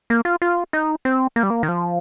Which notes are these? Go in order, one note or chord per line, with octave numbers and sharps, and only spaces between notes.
A#3
F4
F4
D#4
C4
A#3
G3
A#3
D#3
F3